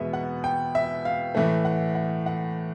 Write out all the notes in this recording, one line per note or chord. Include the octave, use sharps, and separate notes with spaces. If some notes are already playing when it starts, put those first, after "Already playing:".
Already playing: E2 B2 G#3 B3 E5
F#5
G5
E5
F5
A2 E3 A3
F#5
F#5
F#5